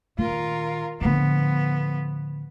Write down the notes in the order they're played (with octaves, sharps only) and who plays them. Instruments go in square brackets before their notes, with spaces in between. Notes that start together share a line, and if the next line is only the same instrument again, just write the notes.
[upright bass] A#2 D#3 [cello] F4 A#4
[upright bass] A2 D3 [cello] F3 B3